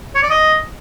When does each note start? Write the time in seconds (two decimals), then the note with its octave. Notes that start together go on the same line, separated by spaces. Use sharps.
0.15 C#5
0.23 D5
0.30 D#5